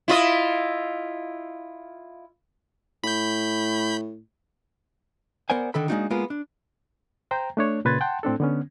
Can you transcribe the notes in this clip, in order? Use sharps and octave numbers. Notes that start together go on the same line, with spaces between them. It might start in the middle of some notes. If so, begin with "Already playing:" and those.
E4 F4 D#5
A2 B5 G6
B3 A#4 C5 D5 F#5 G#5
D3 D#3 A4 B5
G#3 A#3 D4 D#4 F#4
G#3 A#3 B3 F4 A#4
D4
C5 G5 A#5
A3 D4 C#5
A#2 C#3 B4 C6 G#6 A6
F#5 G5 A5 C6
A2 C4 D4 A4
D3 B3 C#4